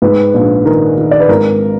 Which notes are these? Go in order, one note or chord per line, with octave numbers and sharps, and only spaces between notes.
G#2 B4
A#1
D#3 A#4
D#3
D5
B4
G#1 A#4